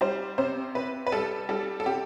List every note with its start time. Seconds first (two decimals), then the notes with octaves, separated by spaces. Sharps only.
0.01 G3 C5
0.38 C3 C5
0.75 C3 B4
1.07 B4
1.12 G3 A4
1.49 G3 A4
1.80 A4
1.86 C3 G4